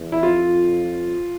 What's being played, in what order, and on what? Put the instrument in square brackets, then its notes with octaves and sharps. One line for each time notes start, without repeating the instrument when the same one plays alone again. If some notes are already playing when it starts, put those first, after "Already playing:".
Already playing: [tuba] E2
[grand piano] E4
[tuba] F2 [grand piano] F4